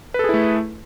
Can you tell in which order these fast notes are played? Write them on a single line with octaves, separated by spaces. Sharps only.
B4 A4 G#4 E4 A3